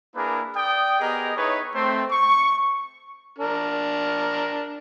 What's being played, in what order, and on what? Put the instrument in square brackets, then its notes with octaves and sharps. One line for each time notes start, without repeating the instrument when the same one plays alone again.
[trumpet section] A#3 D4 E4 G#4 A#4 B4
D5 G5 D#6
B3 G4 G#4 A#4 D#5
D#4 E4 G#4 B4 C#5
A3 C4
C#6
[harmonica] D4 A#4